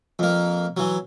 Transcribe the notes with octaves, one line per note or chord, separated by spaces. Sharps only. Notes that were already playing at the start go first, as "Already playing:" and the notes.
F2 A#3
E3 F#3